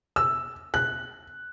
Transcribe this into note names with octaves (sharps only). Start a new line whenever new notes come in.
E6
F#6